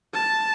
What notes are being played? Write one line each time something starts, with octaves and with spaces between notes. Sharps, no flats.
A5